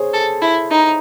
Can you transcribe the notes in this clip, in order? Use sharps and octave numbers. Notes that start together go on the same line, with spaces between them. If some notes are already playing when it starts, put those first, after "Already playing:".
Already playing: G#4 C5 C#5
A4
E4
D#4